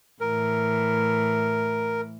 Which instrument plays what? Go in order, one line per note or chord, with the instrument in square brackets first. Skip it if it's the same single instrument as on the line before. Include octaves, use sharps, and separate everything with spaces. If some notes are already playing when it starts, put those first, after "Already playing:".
[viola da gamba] A2 E3 [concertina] A#4